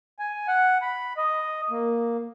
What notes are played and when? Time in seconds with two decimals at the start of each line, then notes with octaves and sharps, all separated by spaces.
0.19 G#5
0.48 F#5
0.82 B5
1.17 D#5
1.70 A#3